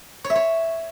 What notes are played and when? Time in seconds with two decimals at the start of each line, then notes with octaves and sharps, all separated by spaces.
0.24 C#5
0.30 E5
0.35 C#5